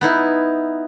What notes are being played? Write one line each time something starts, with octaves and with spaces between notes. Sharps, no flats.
B3 D#4 E4